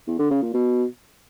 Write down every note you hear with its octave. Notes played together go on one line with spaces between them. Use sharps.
E2
D3
C#3
A#2
B2